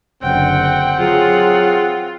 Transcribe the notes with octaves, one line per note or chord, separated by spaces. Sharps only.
F#1 D3 C4 F#5 G5
F#3 F4 G#4